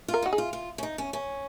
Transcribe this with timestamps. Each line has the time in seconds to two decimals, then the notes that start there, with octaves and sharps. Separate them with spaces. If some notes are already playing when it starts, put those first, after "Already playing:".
0.08 F4
0.14 A#4
0.23 D#4 F#4
0.33 G#4
0.38 F4
0.53 F4
0.78 C#4
0.83 D#4
0.98 C#4
1.13 C#4